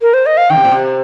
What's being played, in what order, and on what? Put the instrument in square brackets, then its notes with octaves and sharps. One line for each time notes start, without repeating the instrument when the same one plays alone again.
[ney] A#4
C5
D#5
F5
[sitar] D#3 [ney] G5
[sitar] C3
A#2
C3